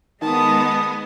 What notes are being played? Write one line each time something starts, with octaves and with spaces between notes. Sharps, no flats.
D#3 G#3 B3 A5 D#6